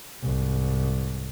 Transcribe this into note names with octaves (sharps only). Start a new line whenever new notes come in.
C2 G#2